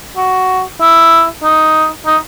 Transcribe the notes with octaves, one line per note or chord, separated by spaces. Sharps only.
F#4
E4
D#4
D#4